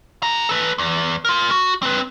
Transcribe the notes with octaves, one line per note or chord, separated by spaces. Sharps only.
G4 A#5
A4 B4
E2
F4 A#4
F#4
C4 B4